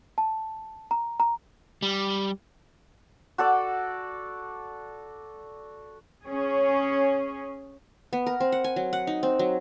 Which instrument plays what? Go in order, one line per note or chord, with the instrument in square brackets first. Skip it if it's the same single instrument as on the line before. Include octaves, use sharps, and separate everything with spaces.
[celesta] A5
A#5
A#5
[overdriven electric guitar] G3
[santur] F#4 A4 D5
[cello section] C#4 G#4 C#5
[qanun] B3
A#4
C4
F#5
G#5
F#3
F#5
D#4
C4
F#3